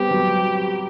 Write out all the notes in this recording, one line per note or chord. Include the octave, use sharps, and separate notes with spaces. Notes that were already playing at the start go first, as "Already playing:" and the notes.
Already playing: G3 B3 C4 G4
F#3